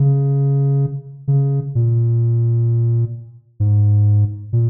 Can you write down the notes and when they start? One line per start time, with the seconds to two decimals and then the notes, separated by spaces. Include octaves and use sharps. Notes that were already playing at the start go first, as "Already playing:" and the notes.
Already playing: C#3
1.28 C#3
1.75 A#2
3.60 G#2
4.53 A#2